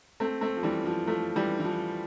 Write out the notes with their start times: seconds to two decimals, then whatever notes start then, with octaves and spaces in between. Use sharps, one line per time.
0.20 A3 C4
0.41 A3 C4
0.57 F3
0.63 E3 G3
0.86 F3
1.07 F3 A3
1.35 E3 G3
1.60 E3
1.65 F3